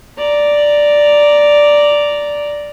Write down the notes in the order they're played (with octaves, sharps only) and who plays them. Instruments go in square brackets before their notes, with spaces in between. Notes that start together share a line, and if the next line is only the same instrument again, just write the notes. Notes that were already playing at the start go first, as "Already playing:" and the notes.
[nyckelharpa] D5 A#5